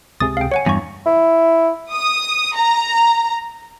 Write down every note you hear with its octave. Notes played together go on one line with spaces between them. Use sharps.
C#2 C3 G#4 D#6 A6
F5 G5
C#5 F#5 G#5 C#7
E2 G2 G#5 C#6
E4
D#6
A#5